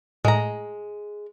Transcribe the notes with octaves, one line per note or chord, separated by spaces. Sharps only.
A2 G#3 A#5